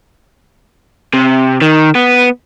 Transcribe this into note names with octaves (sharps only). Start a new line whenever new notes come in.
C3
D#3
B3